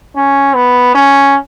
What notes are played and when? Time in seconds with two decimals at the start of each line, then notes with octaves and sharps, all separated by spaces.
0.16 C#4
0.55 B3
0.95 C#4